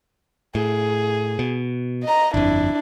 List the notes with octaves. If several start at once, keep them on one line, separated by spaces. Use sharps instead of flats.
A2 G#4
B2
D#5 A#5
G1 F2 D4 E4